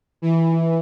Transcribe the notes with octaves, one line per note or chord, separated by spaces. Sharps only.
E3